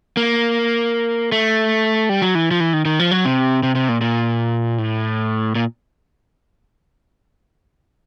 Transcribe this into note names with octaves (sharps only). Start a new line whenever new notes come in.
A#3
A3
G3
F#3
E3
F3
E3
D#3
D#3
F3
F#3
C3
C3
C3
A#2
A#2
A2
A#2